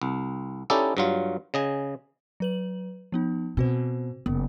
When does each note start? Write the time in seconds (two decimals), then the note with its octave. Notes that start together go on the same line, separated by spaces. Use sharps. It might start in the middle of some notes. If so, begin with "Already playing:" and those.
0.02 C2
0.70 C#4 D#4 E4 G4 A4 D5
0.97 G2 F#3 F4
1.54 C#3 D#5 G#5
2.40 F#3 B4 F#7
3.12 F3 B3 D#4
3.57 B2 C4 F#4 C5
4.26 F#1 B3